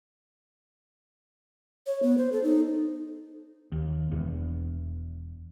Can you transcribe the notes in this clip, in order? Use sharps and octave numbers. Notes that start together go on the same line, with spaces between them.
C#5
B3
C5
A4
D#4
D#2
E1 E2